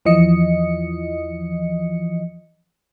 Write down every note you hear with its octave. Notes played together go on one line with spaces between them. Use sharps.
E2 E3 F3 D#5 C#7